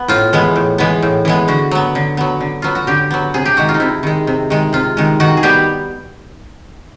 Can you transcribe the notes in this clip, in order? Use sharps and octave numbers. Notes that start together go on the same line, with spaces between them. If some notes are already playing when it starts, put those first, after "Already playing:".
Already playing: B3
A2 F4
E3 G#3 B3
A2
E3 G#3 B3
A2
E3 G#3 B3
D3 F#4
F#3 B3
D3
F#3 B3
D3
F#3 B3 F4
F#4
D3 G4
F#3 B3
C3 G#4
G4
D#3 G#3 F#4
F4
D#4
C3 E4
D#3 G#3
C3
D#3 G#3
C3 F4
D#3 G#3
D#3 F#4
G#4
G3 B3 G4